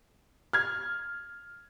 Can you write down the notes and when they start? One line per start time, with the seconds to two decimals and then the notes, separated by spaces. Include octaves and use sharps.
0.53 F6 G#6